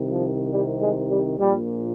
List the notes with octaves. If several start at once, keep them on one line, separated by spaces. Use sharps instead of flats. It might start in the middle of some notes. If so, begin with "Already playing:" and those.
Already playing: C2 C3 D#3
F3
G3
G#3
G3
A#1 A#2 G3